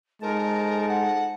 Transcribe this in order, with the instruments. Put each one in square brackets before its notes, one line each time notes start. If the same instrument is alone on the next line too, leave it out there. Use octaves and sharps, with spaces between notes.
[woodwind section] F2 D#4 A5 [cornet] G#3 [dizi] A#4
[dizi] F#5